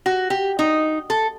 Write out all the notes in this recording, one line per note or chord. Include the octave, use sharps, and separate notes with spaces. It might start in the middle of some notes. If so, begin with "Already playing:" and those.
F#4
G4
D#4
A4